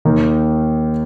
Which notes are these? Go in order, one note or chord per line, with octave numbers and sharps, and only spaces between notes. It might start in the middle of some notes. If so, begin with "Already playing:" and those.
D#2 D#3 A#3 D#4